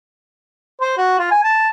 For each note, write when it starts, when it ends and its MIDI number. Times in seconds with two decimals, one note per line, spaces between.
0.81 0.94 72
0.97 1.18 66
1.19 1.27 65
1.31 1.39 80
1.44 1.70 81